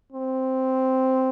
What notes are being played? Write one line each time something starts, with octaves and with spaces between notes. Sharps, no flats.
C4